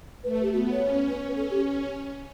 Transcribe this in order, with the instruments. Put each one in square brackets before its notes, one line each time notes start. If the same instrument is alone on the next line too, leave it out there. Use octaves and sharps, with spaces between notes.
[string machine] A3 [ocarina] B4
[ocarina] B4
G4
[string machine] B3 [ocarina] F#4
[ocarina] C#5
[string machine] C#4
[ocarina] B4
[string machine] C#4 [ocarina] A4
[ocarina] G4